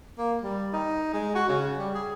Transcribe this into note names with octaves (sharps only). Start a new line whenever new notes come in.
A#3
G3
D#4
G#3
F#4
C#3
G3
G#4